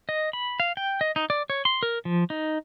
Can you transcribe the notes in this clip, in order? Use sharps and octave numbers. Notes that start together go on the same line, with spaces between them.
D#5
B5
F5
G5
D#5
D#4
D5
C#5
C6
A#4
F3
D#4